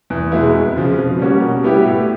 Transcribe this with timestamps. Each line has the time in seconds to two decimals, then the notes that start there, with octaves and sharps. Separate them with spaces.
0.10 E2
0.32 B2 G#3 B3 E4
0.54 F2
0.76 C#3 F3
0.97 B2
1.19 G3 A#3 C#4 F#4
1.41 B2
1.63 G3 B3 E4 G4
1.85 A2